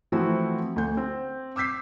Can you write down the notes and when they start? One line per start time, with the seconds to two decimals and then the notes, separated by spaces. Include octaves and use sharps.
0.12 E3 F3 A3 C4 E4 F#4
0.76 D2 G6
0.97 C4
1.56 D6 E6 G6 B6 C7